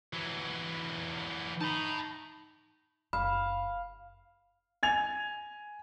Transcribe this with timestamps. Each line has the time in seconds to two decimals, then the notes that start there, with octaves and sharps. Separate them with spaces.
0.13 E3 F#3
1.61 D#4 A5 B5
3.13 F#1 F5 B5
4.83 G#5 G#6 F7